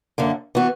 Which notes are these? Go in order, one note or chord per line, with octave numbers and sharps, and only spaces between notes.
F#2 D3 A#3
E3 B3 F#4